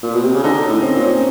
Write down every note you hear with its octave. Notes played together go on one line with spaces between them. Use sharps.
A#2
B2
C3
C#3
D3 D#4
C#4
A2
C4
A#2
C#4